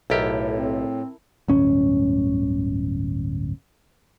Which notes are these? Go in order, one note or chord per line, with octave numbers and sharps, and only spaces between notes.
B1 A2 E4 G4 A4 A#4
C4
D1 G1 C#4